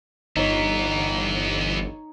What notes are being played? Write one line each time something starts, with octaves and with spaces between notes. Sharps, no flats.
G1 E3 B3 D#4 C#5